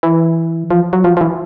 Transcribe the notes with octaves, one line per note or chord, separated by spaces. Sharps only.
E3
F3
F#3
F3
F3
E3